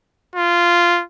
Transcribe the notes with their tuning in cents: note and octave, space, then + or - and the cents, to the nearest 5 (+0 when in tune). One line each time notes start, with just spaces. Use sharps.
F4 -10